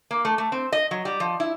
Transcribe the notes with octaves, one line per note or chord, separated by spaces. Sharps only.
A#3
A3
A3
C4
D#5
F#3
G3
F3
E4